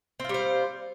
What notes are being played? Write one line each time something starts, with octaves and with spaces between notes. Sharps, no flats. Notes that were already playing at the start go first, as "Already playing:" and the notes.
G3 C4 F4 C5